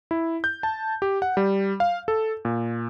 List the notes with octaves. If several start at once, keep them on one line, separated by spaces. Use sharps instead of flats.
E4
G6
A5
G4
F#5
G3
F5
A4
A#2